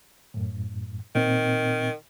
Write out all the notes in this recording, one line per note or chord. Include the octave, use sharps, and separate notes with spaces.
F#2 A2
A#2 D#3 C4